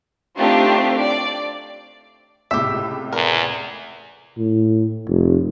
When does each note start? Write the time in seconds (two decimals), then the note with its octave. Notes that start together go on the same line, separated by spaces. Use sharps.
0.39 A3 C4 D4 D#4 F4 G4
1.00 D5
2.51 C#2 A2 C3 G4 E5
3.13 E2 A#4
4.37 A2
5.08 F1